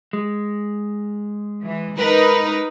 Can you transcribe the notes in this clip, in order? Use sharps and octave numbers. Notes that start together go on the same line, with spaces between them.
G#3
E3
D#4 A#4 B4